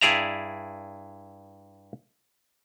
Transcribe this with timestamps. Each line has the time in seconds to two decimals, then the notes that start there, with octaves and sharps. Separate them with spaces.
0.01 G2 E4 G#4 D5 E5 A#5